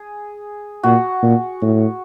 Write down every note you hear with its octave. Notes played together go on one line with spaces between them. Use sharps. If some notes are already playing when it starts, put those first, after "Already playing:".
Already playing: G#4
A#2 F#4
A#2
A2